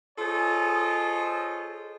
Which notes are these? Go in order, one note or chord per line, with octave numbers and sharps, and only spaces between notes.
F4 G#4 A4 C5 C#5 D#5